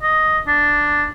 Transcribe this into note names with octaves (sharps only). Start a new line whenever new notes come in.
D#5
D4